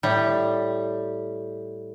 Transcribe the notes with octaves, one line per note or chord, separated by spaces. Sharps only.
A2 G3